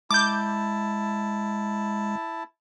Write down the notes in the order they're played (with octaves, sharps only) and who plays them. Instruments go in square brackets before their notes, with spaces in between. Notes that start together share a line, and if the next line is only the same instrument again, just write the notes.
[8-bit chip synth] G#3 [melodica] E4 A5 [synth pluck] D6 G6